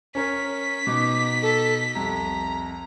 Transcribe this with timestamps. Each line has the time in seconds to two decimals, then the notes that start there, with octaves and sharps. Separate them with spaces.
0.15 C#4 A#4 C#5 B6
0.87 B2 D#4 D6
1.42 A4
1.95 C2 F2 A#5